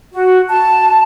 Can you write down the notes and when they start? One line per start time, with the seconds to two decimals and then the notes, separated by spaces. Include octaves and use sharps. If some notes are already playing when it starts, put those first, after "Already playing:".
0.13 F#4
0.49 A5